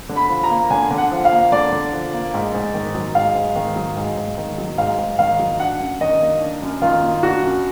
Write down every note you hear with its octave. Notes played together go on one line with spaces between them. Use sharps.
D3
B5
F3
A#5
A#3
D3 G#5
D3
F#5
F3
F5
A#3
D3 D5
D3
F3
A#3
G#2
G#2
D#3
F#3
G#2 F5
G#2
D#3
F#3
G#2
G#2
D#3
F#3
G#2 F5
G#2
D#3 F5
F#3
D4 F#5
F#2
D#3 D#5
A#3
D4
F#2
D#3 F4
A#3
D4 F#4
F#2